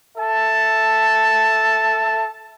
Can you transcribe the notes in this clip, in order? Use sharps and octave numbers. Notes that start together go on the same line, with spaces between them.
A4 E5 A5